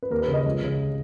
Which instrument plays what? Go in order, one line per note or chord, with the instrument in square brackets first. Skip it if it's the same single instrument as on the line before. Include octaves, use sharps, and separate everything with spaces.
[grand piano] B4
D#2 A#4
B4
C#3
D#5
C#2
C#3